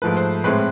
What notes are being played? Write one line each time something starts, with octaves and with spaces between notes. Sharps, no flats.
G#2 F3 A3 B4
C5
A2 G#3 C4 B4